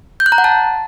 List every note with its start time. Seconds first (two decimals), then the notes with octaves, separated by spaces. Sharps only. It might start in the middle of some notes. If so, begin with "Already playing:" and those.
0.20 G6
0.26 F#6
0.32 A#5
0.38 F#5
0.44 A5